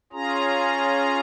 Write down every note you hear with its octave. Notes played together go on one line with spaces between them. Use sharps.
C#4 F4 G#4 A#5